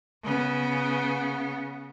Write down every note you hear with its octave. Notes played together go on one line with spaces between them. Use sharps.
C#3 B3